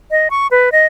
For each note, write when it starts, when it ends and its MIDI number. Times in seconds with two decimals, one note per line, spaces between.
0.11 0.28 75
0.30 0.47 85
0.51 0.72 71
0.72 0.86 75